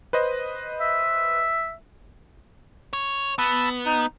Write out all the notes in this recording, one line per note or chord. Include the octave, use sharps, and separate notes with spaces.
B4 C5 D#5
E5
C#5
B3 A5 B5 E6
D#4